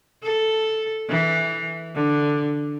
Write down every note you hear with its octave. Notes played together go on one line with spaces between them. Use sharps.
A4
E3
D3